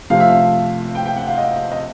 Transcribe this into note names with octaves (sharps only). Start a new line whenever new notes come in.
F2 C3 F3 A3 F5
E5
F5
G5
G5
F#5
F5
D#5
D#5